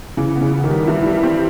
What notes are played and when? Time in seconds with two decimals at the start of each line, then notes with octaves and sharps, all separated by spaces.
0.17 C#3 E3
0.35 B3
0.41 C#3
0.53 E3
0.64 D#3
0.70 G3
0.87 G2 E3
1.06 G3
1.23 C4